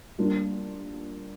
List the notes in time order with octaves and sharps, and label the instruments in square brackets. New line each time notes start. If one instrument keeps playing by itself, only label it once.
[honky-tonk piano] G3 A#3 D4 F4